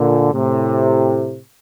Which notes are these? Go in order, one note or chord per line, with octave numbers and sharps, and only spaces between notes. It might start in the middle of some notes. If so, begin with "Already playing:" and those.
Already playing: A#2 D3
A2 C3